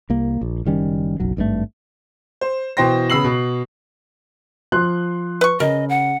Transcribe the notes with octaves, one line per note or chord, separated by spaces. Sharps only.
C2 A#3
A#1
F#1 D#3 G3 C#4
F#1 B1 F#3
G#1 G2 C3 A3
C5
B2 E3 C5 G5 C6 A#6
C#3 B3 B5 E6 C7 F#7
B2
F3 C6 F#6
B4 C#6
C#3 A#4 D#5
F#5